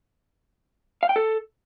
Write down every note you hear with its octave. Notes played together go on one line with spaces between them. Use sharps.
F5
G5
A4